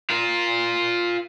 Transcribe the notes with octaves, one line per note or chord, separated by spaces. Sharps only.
F4 A#4